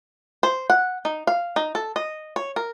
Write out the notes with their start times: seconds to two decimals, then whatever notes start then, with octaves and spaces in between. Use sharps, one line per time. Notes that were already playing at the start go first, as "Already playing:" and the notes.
0.43 C5
0.70 F#5
1.05 D#4
1.27 F5
1.56 D#4
1.75 A4
1.96 D#5
2.36 C#5
2.56 A#4